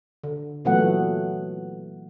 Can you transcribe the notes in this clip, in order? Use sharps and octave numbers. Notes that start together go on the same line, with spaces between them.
D3
A#2 E3 F#3 A3 B3 F#5